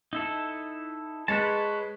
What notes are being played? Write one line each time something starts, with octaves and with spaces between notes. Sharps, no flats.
D#4 E4 A4
G#3 B4 C#5 A5